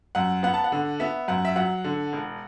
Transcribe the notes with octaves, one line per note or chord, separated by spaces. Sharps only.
F#2 F#5
B3 F#5
A5
F#5
D3
B3 E5
F#2 F#5
E5
F#3 F#5
D3
E1